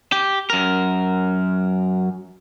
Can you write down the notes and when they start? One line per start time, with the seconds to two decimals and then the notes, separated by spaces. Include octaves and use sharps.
0.12 G4
0.50 F#2 A#4